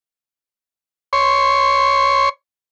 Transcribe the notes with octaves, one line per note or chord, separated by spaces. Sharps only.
C#5 C6